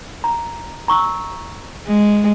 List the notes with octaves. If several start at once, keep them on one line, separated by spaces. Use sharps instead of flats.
A#5
A#5 C#6 E6
G#3